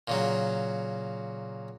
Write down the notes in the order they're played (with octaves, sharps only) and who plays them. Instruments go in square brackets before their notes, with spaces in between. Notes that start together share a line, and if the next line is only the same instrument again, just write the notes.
[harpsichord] A#2 C#3 F#3